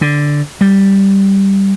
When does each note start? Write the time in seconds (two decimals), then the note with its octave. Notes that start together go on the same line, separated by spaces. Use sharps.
0.01 D3
0.61 G3